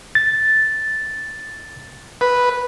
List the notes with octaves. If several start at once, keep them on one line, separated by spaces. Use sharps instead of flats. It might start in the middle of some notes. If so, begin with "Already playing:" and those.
A6
B4